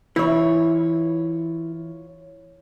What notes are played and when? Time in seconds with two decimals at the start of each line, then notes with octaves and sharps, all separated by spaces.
0.16 E3 E4 F4 C#5